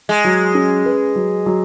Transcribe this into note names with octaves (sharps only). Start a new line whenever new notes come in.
G#3
F#3
C#4
B4
F#3
F#3